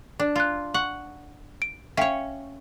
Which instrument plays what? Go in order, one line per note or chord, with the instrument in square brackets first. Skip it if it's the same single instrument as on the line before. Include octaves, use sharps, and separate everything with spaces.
[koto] D4
[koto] F4 [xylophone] F#6 C7
[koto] F#5 [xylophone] C#6
[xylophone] D7
[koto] C#4 C#5 [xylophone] E5 F5 G5